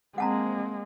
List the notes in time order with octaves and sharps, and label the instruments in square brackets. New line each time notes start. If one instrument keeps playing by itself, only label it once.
[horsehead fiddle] G#3 A#3 [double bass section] C4 [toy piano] F#5 A5 A#5